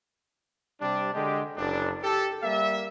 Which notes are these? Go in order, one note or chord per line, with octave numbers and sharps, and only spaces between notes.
C3 G3 D4
D3 G#3 G4
F#1 D4
G4 A4
G3 A#3 E5